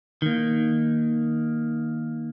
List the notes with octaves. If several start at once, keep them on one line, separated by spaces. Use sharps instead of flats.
D#3 A#3